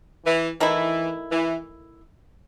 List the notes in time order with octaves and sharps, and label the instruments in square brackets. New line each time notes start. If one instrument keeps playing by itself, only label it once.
[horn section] E3
[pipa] D#3 A3 E4 [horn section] E3
[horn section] E3